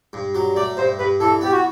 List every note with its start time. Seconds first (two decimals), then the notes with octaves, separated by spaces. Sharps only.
0.13 G2
0.35 F#3
0.56 A3 D5
0.77 G2 C5
0.99 G2 B4
1.20 E3 A4
1.41 B3 G4
1.52 F#4